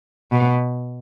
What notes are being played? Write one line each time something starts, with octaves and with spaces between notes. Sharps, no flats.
B2